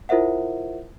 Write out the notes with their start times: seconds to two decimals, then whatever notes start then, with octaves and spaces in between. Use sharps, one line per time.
0.09 E4 F4 A#4 C5 E5 F#5